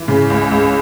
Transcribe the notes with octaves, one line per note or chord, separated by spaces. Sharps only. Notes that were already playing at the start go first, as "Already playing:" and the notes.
Already playing: E3
C#3
C#2
C#2